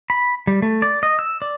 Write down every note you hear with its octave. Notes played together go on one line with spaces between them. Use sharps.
B5
G3
A3
D5
D#5
E6
D5